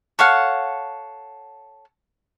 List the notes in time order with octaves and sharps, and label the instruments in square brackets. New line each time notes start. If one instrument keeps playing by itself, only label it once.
[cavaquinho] A4 C#5 F5 F#5